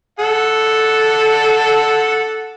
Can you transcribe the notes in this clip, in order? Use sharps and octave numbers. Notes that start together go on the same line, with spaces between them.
A4 F#5